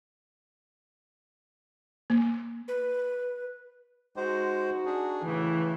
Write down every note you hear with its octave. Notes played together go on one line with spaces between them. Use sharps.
A#3
B4
G#3 D#4 F#4 C5
D4 G#4
A2 C#3 E3 A3